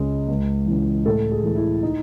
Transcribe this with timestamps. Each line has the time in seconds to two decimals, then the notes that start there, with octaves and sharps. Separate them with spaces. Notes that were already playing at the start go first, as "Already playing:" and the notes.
Already playing: C#2 C#3 G#3
0.28 C#2
0.66 C#3 E3
1.06 A2 A4
1.32 G#4
1.43 E3 A3
1.56 E4
1.83 D#4